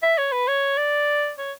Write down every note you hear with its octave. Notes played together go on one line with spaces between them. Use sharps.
E5
C#5
B4
C#5
D5
C#5